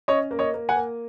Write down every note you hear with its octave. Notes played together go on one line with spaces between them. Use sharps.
C#4 C#5 D#5
A#3
C#5 D#5
A#3
F#5 G#5
A#3